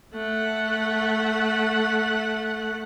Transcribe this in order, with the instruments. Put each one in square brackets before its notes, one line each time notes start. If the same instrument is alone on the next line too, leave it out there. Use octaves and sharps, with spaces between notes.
[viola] A3 F#5